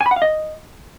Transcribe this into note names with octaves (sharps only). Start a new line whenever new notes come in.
G#5
B5
F#5
F5
D#5